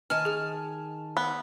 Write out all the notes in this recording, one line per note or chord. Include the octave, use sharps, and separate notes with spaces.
D#3 G#5 A5 F6
G#4 F6
B3